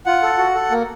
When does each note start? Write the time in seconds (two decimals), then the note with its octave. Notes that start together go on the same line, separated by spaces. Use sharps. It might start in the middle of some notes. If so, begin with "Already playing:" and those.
0.06 F4 F#5
0.23 A4
0.38 F#4
0.55 A4
0.71 A#3